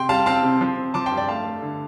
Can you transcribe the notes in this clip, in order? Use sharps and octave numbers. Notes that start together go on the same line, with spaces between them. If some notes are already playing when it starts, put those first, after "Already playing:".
Already playing: C3 G5 C6
G3 F5 A5
C4 F5 A5
C3
F3
C4
F3 A5 D6
G5 C6
G2
D5 G5
A3 F5 A5
A3
D3